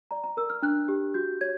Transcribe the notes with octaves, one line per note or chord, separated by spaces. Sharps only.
D5 A#5
A#5
A#4 E6
F6
D4 F#6
G4
F#4 G6
C#5 G#6